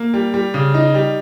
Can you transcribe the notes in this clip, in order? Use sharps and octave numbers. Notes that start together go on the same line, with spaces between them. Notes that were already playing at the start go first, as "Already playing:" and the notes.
Already playing: A#3
G3
G3
C#3
D#4
G3